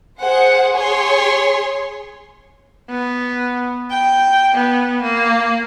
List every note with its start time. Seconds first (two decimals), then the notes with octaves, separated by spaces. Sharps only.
0.21 G#4 C5 F#5
0.73 G#4 C#5 C6
2.90 B3
3.91 G5
4.55 B3
5.02 A#3